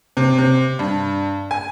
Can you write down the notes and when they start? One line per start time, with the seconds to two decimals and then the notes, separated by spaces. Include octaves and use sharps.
0.17 C3
0.38 C3
0.79 G2
1.51 G#5